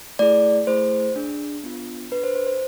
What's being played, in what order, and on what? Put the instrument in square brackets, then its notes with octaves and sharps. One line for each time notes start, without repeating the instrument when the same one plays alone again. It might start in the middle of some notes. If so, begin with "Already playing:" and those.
[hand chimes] A3 E4 G#4 D5
A3 E4 G#4 C5
D4 G#4
B3 D4 F4
D4 B4
A4
C5
C5
C5